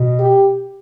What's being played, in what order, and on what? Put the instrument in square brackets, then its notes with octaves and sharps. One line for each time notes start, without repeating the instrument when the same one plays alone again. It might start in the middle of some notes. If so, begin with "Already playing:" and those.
Already playing: [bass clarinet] B2
[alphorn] G4